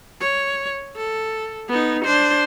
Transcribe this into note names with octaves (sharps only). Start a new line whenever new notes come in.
C#5
A4
B3 D#4
D4 C5